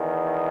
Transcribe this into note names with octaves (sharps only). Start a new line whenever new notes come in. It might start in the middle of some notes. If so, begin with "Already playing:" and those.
Already playing: E2 D#3